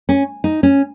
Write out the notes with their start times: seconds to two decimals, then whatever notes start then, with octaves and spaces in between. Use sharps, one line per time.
0.09 C#4
0.44 D#4
0.63 C#4